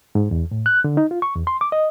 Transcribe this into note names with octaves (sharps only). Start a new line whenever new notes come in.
G#2
E2
A2
F#6
D3
D#4
F4
C#6
E2
C6
D6
D#5